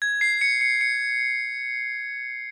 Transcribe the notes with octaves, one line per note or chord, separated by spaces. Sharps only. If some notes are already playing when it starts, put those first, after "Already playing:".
G#6
C7
C#7
C#7
C#7